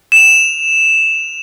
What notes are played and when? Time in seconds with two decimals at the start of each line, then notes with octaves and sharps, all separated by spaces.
0.12 E7 F7